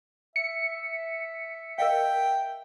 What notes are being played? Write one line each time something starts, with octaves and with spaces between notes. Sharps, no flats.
E5 C#7
A#4 D#5 F5 G5